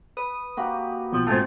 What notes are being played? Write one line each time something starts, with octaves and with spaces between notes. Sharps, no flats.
B4 D#6
A#3 F#4 G4
B1 B2 F3
G#2 A3 C4 F4 A5